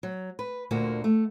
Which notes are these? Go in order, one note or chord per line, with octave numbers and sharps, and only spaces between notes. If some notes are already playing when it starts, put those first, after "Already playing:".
F#3
B4
D2 A#2 D3 A#3 F#4
A3